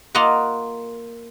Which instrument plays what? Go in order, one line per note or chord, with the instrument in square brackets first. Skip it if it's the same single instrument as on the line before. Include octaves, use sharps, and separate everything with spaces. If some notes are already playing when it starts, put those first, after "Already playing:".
[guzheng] A#3 F4 A#4 D#5 F#5